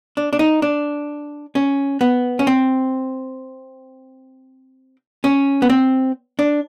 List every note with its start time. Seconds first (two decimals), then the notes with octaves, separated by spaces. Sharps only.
0.17 D4
0.33 D4
0.39 D#4
0.62 D4
1.55 C#4
2.01 B3
2.39 C#4
2.47 C4
5.24 C#4
5.62 B3
5.70 C4
6.39 D4